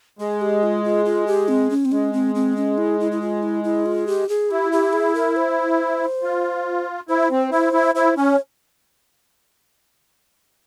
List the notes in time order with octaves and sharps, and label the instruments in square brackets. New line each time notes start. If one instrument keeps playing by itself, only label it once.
[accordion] G#3 [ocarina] G#4
[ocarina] G4
F4
F4
F4
G4
C4
C#4
C4
[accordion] G#3 [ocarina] C#4
[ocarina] C4
C4
C#4
E4
E4
E4
F4
E4
E4
F4
G4
G#4
[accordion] E4 [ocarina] G4
[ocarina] G4
G#4
A#4
C5
[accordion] F4
[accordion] E4 [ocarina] C5
[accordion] C4
[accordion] E4 [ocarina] C5
[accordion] E4
[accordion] E4 [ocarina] C5
[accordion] C#4 [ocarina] C#5